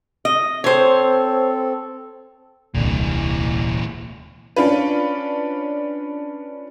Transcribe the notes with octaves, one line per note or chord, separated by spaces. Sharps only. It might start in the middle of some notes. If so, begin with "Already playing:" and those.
D#5
C4 A4 C5 C#5
D#1 C2 A#2 D3 E3
C#4 D4 F4 B4